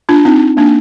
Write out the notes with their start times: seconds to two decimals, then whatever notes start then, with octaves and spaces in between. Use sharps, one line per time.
0.09 D4 F4
0.25 C4 D#4
0.57 A#3 D4